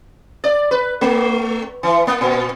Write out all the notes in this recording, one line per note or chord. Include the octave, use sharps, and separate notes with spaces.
D5
B4
A3
E3
A#3
A#2